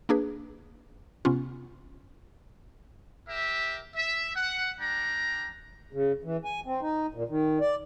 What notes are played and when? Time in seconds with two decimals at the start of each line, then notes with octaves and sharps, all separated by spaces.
0.09 A#3 D4 G#4 B4
1.25 C3 B3 C#4 F4
3.29 G4 A#4 E5
3.95 E5
4.35 F#5
4.79 G3 D4 G5 A#5
5.93 C#3
6.24 E3
6.45 G#5
6.66 C4
6.82 D#4
7.14 A#2
7.29 D#3
7.61 D5